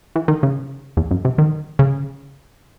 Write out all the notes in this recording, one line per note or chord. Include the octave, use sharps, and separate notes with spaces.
E3
D#3
C#3
E2
F#2
C3
D#3
C#3